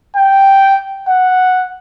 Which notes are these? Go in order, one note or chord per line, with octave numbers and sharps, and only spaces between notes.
G5
F#5